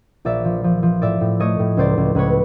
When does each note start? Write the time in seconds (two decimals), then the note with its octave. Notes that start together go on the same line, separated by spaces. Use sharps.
0.25 A#1 D5 E5
0.45 F3
0.64 F3
0.83 F3
1.02 A2 D5 E5
1.21 A2
1.40 A3 C#5 D#5
1.59 A2
1.77 C#2 C5 D5
1.97 C#2
2.15 C#2 B4 C#5